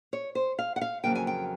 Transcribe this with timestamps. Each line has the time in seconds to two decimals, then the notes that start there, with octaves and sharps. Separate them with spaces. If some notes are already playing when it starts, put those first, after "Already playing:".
0.13 C#5
0.35 C5
0.59 F5
0.76 F#5
0.81 F5
1.04 F2 C#3 F#3 A#3 G5
1.15 G#5
1.27 G5